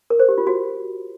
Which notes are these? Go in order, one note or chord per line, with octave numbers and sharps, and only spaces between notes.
A#4
C5
G4
F4
F#4